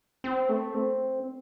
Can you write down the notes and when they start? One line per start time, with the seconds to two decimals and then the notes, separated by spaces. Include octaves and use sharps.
0.24 C4
0.49 A3
0.74 C4